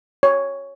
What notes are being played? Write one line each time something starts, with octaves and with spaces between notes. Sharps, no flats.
C#5